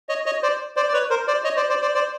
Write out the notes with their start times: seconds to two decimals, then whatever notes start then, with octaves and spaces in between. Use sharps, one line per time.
0.09 C#5 D#5
0.26 C#5 D#5
0.43 C5 D5
0.76 C5 D5
0.88 D5
0.93 B4 C#5
1.10 A#4 C5
1.27 C5 D5
1.44 C#5 D#5
1.56 C5 D5
1.69 C5 D5
1.82 C5 D5
1.94 C5 D5